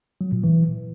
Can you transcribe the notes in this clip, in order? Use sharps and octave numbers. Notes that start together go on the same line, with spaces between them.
F#3
A#2
E3